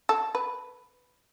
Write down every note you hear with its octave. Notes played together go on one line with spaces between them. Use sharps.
A4
B4